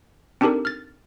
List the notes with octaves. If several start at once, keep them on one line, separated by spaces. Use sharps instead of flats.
C4 D4 D#4 G4 A4 A#4
F6 A6